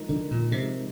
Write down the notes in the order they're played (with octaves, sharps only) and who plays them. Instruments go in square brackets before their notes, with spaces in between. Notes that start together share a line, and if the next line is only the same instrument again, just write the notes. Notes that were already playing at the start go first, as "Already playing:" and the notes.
Already playing: [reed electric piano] F3 G#3 D#4 A#4
[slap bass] D3
A#2
[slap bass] C3 [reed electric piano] F3 G#3 D#4 A#4